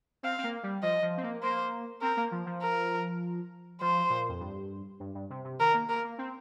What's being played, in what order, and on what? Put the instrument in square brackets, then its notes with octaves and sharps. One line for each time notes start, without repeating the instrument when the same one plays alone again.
[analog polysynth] C4 [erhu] F5
[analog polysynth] C4
A#3
G3
[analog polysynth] F3 [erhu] D#5
[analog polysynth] F3
C4
A#3
[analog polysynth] A#3 [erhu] C5
[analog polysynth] C4 [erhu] A#4
[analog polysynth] A#3
F3
F3
[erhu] A#4
[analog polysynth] F3 [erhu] C5
[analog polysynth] A#2
F2
G2
G2
G2
C3
C3
[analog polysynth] D#3 [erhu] A#4
[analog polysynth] A#3
[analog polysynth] A#3 [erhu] A#4
[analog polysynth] A#3
C4